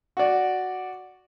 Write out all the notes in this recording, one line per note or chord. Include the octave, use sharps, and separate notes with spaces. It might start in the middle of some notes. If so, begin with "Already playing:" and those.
F#4 D5